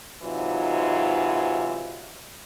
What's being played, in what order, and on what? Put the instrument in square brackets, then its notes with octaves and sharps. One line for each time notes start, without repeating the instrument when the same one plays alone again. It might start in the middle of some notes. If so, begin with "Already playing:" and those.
[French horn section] G#2 C3 E3 F#3 D#4 F4